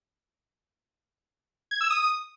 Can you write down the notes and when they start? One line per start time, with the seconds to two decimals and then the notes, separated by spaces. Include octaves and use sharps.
1.71 G#6
1.81 E6
1.90 D#6